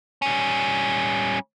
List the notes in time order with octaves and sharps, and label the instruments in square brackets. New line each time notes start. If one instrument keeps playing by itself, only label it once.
[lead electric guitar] G3 C#4